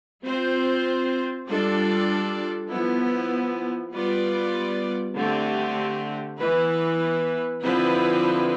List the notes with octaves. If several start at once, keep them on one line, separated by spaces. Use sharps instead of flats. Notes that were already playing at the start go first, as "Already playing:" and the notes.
C4 F4 C5
G3 D4 F4 A4 D5
F3 B3 E4
G3 B3 F4 B4 D5
D3 A3 C4 G4
E3 B3 E4 B4
D3 F3 C4 E4 B4